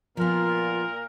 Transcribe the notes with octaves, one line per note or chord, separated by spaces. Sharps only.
A#2 F3 B3 F4 A#4